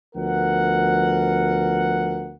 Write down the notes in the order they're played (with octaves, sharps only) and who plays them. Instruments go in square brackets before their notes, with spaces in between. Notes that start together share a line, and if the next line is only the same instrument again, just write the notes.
[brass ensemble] D2 F3 B3 A#4 F#5